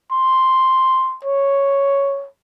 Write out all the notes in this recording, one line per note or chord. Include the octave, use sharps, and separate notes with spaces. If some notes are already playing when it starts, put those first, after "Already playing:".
C6
C#5